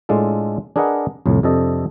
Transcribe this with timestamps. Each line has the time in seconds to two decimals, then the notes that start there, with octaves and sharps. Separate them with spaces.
0.09 A2 G#3 D4 F4 A4
0.76 D4 G#4 A#4 B4 D#5 F#5
1.26 C2 F2 A2
1.43 F2 C3 D4 A4 D#5